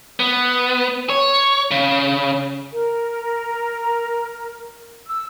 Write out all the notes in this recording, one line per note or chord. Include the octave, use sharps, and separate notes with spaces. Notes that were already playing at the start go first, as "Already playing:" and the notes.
B3
C#5
C#3
A#4
E6